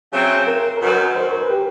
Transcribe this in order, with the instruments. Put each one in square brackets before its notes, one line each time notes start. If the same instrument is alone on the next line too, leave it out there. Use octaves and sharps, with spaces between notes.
[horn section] C#3 F#3 A3 C4
[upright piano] A#4
A#4
[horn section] F#2 D#3 F#3 [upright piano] B4
[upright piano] C5
A#4
B4
G4